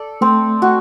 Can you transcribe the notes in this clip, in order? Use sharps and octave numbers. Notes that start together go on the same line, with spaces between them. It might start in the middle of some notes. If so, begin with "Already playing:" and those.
Already playing: A4 D5
A3 C4
F#4